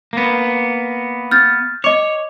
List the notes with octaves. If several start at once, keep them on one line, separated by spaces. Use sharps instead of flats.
A#3 B3
F6 G6 A6
C#5 D#5 D6